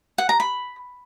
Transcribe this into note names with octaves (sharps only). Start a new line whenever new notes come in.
F#5
A#5
B5